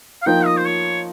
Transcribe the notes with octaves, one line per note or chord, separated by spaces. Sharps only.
F5
F3 A#3 D#4 G5
D#5
C5
C#5